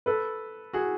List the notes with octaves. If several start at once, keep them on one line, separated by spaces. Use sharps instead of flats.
A4 B4
F#4 G#4